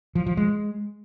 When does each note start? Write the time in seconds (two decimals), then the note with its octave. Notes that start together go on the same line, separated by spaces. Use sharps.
0.15 F3
0.26 F3
0.37 G#3